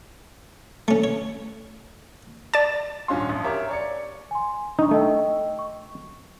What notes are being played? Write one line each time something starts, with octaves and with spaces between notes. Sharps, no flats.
A3 C#4
C#5
D5 A5
D#1 G#2 C#4 F#4 F5 C6
A1 F2
G4 A#4 C#5 E5 F5 D6
C#5 D5 C#7
G#5 C6
D4 D#4 C#6
A3 D#5 G5 E6
C#6